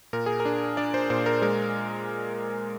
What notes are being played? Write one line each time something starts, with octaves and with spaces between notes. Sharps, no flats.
A#2 A#4
G#4
A#4
D4
D4 D5
C5
A#2 C5
A#4
G#3 A#4